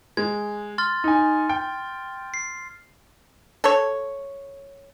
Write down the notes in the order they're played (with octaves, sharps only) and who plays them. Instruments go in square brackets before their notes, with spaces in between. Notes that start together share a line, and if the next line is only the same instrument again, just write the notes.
[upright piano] G#3 [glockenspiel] G#6
[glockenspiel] C6 F6 A6
[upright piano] D#4 G#5
G5
[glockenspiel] C7
[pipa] A4 C#5